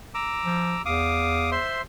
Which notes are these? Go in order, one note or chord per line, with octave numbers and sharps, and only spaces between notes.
A#5 D6 E6
F3
E2 F5 D6 D#6
C5 E5 C6